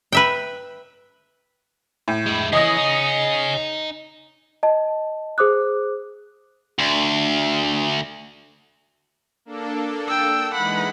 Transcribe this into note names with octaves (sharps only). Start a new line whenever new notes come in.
B4 E5 G5
A2
G#3 E4
E3 G#4 C#5 D#5 D#6 A#6
D#4
D#5 A5
G#4 C5 D6 D#6 F#6
D2
A#3 D4 A4
G5 E6
E3 G#3 D#4 F#5 B5